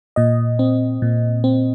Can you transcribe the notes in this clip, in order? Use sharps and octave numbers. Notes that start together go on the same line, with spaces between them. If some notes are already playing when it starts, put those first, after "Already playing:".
A#2 D#5
C4
A#2
C4